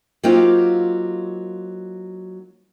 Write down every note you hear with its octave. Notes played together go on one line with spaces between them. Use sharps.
F#3 A#3 C4 D#4 F4 G4